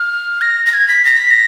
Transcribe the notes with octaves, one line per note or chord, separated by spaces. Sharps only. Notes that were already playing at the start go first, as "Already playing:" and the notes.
Already playing: F6
A#6
A#6
G#6
B6
A#6
B6
A#6